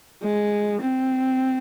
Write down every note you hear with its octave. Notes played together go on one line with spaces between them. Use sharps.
G#3
C4